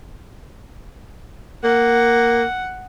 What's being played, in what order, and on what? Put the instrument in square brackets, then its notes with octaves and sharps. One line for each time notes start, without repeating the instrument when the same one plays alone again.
[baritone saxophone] A#3 [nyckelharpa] F#5